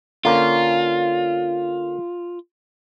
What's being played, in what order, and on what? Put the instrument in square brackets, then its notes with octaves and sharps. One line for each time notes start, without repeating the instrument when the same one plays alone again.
[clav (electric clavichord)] D3 A#3 C#4 [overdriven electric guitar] F4